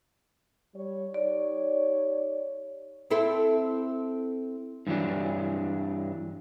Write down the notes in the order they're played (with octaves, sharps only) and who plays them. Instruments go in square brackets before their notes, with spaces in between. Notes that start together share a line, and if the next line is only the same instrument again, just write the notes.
[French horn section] G3 C#5
[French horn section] D#4 G4 C#5 [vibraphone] D5
[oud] C4 E4 A4
[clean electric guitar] G2 E3 F#3 D4